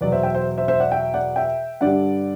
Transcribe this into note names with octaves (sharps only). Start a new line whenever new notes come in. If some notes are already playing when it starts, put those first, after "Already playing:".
E2 B2 F#3 B4 D5
C5 E5
E5 G5
C5 E5
C5 E5
C5 E5
D5 F#5
E5 G5
D5 F#5
E5 G5
G2 D3 G3 D5 F#5